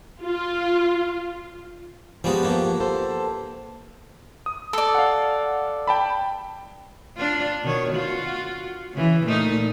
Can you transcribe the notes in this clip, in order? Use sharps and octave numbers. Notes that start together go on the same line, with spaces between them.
F4
F3 G3 G#3 B3 F#4
G2 A#3
B3 A4 C5
D#6
A4 D5
F5 F#5
G5 A5 B5
D4 F4
B2 D#3 C#5
F4 F#4
C#3 E3
A#2 A3 D#4